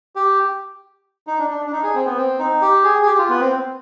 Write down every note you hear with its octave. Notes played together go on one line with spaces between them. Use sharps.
G4
D#4
D4
D4
D4
D#4
G#4
C4
B3
C4
D#4
G4
G#4
G#4
G4
F4
B3
C4